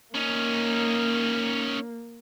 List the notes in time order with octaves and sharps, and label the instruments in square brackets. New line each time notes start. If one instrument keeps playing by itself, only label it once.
[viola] A#3 [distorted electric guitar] C#4 D#4